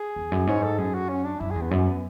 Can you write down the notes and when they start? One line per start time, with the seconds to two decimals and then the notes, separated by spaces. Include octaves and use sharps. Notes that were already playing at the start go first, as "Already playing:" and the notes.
Already playing: G#4
0.16 E2
0.32 F#2
0.47 G#2 C#5
0.63 A4
0.78 F#2 G#4
0.94 F#4
1.09 C#4
1.25 D4
1.40 F#2 E4
1.51 E2 G#4
1.61 B3
1.71 F#2 C#4
1.87 B3